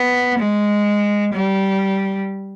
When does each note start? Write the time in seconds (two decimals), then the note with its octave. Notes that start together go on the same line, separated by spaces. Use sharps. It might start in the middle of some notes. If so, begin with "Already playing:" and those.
Already playing: B3
0.38 G#3
1.33 G3